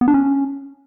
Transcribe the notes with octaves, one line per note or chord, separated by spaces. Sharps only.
B3
D4
C#4